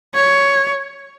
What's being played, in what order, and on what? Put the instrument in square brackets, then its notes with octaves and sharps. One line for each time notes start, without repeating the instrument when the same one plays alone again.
[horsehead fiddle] C#5